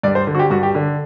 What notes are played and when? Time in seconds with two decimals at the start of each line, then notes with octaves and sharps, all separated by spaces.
0.03 G2 D5
0.15 C5
0.27 D3
0.35 F#4
0.39 G4
0.50 G2 F#4
0.63 G4
0.75 D3